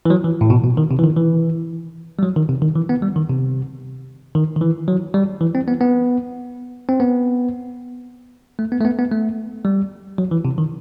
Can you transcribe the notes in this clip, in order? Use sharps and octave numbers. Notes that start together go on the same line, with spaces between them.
E3
F#3
E3
A2
B2
B2
D#3
C3
E3
D#3
E3
G3
F#3
D#3
C3
D#3
E3
B3
G3
D#3
C3
D#3
D#3
E3
F#3
G3
E3
C4
B3
B3
C4
B3
A3
B3
A3
B3
B3
A3
G3
F#3
E3
C3
D#3